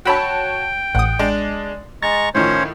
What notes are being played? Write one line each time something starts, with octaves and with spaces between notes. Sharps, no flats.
F#4 C#5 G5 A5 B5 E6
A1 F#5 D#6
G#3 D4
G#3 A#5 C#6 A6
A2 D#3 F3 C#4 C5 C#5